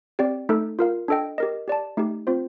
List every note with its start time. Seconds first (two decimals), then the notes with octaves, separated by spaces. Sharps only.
0.19 C4 G4 D5 G5
0.49 A3 D#4 A4
0.79 F4 A#4 F5
1.08 D4 A4 D#5 G5
1.38 G4 A#4 D#5
1.68 G4 D5 A5
1.97 A3 D#4 G4
2.27 C4 F4 C5